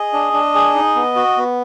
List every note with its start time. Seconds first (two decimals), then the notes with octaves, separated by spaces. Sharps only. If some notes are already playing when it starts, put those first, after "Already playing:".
Already playing: G#4 D#5
0.13 D4
0.33 D4
0.55 G#4
0.75 D#4
0.95 B3
1.16 F#4
1.37 B3